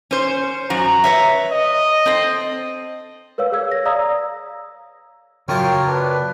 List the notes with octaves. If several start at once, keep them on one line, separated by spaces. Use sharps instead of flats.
C#4 C5
F#2 F#4 A#5
B4 C#5 E5
D#5
C4 A4 C5
A#4 B4 C#5 F5 E6
G#4 C#5 F5 E6 G#6
A#6
D5 F5 A#5 D#6 E6
F#2 C#3 A#3 F4 A#4 C#5 G5 A5
D4 B4